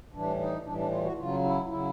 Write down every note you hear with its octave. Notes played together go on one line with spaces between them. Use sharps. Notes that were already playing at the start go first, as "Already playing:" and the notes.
A2 E3 G3 D4
D#4
A2 E3 G3 D4
D4
F4
F#4
C#3 F#3 F4
E4
C#3 F#3 E4